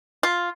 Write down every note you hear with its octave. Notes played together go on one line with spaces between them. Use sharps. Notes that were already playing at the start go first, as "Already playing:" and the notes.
F4